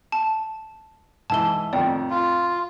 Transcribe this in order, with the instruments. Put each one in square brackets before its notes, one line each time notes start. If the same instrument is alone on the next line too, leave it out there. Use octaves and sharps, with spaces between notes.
[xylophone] A5
[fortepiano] G#2 E3 [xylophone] A5 G7
[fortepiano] F2 A2 D#3 [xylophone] D5 G5
[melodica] F4